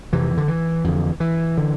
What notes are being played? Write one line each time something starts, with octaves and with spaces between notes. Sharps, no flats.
F2 C3 E3
D3
E3
F2 D3
E3
D3